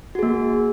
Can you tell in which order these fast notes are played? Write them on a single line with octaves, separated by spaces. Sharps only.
F#4 G#4 A#3